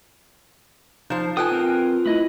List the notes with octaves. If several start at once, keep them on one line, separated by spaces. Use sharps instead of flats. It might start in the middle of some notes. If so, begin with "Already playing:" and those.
F3 D#4 C5 E7
F4 A4 B4 G5 G#5 D#6 F#6
C4 A#4
A3 E4 B4 D#5